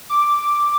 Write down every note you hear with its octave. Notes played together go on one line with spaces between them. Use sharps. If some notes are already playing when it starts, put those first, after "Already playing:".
D6